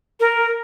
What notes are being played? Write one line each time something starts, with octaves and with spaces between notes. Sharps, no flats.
A#4